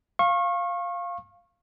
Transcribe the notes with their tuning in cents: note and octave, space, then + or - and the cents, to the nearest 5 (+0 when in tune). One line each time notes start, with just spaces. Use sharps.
F5 +0 C#6 -30